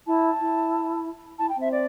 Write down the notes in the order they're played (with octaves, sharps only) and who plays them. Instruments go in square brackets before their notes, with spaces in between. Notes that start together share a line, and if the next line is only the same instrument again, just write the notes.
[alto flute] E4 [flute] A5
[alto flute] E4
[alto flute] E4 [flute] A5
[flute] G5
[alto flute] C4
[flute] E5
D5